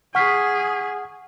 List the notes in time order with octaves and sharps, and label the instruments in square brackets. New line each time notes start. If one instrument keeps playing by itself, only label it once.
[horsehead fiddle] G#4 [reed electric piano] F#5 F6 [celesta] C#6 B6 C7